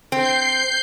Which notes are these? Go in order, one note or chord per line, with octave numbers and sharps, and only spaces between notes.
C4 G6 C7